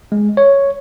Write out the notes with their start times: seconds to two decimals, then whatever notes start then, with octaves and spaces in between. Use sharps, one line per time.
0.12 G#3
0.37 C#5